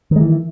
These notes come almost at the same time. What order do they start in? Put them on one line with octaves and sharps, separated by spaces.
D#3 G#3 E3